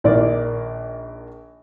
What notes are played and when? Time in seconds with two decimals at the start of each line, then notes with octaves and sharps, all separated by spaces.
0.04 A#1 D#3 A#3 D5